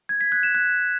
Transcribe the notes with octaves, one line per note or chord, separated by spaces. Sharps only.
G#6
B6
F#6
E7
F#6